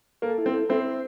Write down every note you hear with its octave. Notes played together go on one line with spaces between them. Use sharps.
A#3 A4
E4
C4
A4
C4 E4 C5
C5